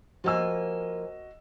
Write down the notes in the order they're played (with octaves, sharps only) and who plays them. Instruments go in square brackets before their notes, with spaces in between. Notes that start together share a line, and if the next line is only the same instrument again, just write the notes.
[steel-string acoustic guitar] F3 A#3 G#5 [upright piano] F#4 D#5 E6